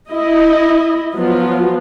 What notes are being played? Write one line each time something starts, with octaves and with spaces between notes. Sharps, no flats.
E4 D#5
F3 F#3 B3 F4